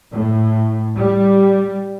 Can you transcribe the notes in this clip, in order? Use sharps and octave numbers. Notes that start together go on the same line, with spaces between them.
A2
G3